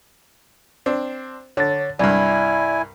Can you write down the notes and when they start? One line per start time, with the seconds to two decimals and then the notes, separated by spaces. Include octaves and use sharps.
0.86 C4 D4
1.57 D3 C#5 A6
1.99 C2 G2 E4 D5 G#5